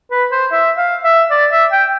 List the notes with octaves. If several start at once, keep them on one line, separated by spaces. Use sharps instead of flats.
B4
C5
E5
F5
E5
D5
E5
G5